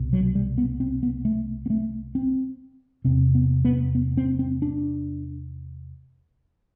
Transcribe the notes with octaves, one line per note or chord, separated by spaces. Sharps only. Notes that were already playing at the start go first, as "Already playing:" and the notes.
Already playing: C2 B2
F#3
G3
B3
C4
B3
A3
B3
A3
C4
E2 C3 C4
B3
B3
B3
C4
C4
D4